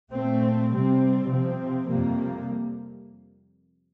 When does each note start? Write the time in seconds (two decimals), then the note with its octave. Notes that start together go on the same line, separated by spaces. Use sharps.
0.12 A#2 A3 C4
0.70 C3 G3 C4
1.28 C3 F3 C4
1.86 F2 C3 G3 A#3